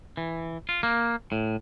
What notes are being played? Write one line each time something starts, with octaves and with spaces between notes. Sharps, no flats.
E3
F4
A#3
A2